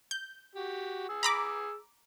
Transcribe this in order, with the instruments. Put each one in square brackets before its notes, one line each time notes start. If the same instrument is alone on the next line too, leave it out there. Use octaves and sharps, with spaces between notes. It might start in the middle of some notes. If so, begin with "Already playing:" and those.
[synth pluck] G6
[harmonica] F#4 G4
G#4 E6
[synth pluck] A#5 B5 D6